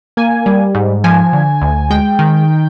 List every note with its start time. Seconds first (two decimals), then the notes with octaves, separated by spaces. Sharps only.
0.17 A#3 G#5
0.46 G3
0.75 G#2
1.04 F3 G#5
1.33 D3
1.61 D2
1.90 G#3 G5
2.19 D#3